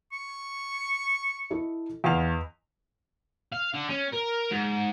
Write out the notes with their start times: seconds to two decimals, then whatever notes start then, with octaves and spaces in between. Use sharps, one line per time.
0.12 C#6
1.50 E4 A4 D#5
2.04 E2 D#5 F5 F7
3.52 F5
3.74 D3
3.90 C#4
4.13 A#4
4.51 G#2